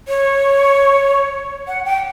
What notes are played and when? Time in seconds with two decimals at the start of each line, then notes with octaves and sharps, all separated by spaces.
0.08 C#5
1.68 F#5
1.85 G5